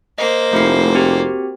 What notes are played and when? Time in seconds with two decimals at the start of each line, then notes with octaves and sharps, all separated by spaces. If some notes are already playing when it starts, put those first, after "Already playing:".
0.18 A#3 C5 D#5
0.53 F1 A3 E4 C7
0.95 C4 F#4 G4